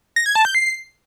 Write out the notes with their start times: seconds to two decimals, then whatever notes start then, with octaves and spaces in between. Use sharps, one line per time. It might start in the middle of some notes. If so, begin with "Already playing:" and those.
0.16 A#6
0.26 G#6
0.35 A5
0.45 G6
0.55 C7